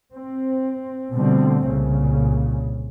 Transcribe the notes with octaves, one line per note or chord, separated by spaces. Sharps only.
C4
B2 D3 G3 A3 C4
C2 A#2 C#3